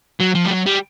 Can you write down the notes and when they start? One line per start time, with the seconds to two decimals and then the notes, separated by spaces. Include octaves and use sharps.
0.20 F#3
0.35 F3
0.46 G3
0.51 F#3
0.66 G3